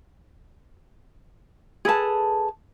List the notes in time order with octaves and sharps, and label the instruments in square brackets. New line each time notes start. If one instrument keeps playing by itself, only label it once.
[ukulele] G#4 A4 B4 A5